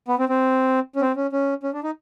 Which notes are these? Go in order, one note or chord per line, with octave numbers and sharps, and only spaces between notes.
B3
C4
C4
C#4
C4
C#4
C#4
C#4
D4
D#4